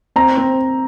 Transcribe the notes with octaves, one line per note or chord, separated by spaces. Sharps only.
C4 A#5
C4